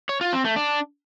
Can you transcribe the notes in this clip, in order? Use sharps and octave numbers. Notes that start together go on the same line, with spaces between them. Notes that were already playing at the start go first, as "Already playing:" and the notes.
C#5
F4
C4
A3
D4